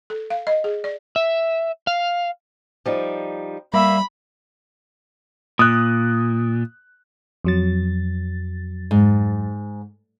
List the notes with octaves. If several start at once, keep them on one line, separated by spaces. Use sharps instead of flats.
A4
F5
D#5
G#4
D5
E5
F5
F3 G3 D#4
G3 A#3 E5 B5
A#2 D#6 F#6
F2 F#3 A6
G#2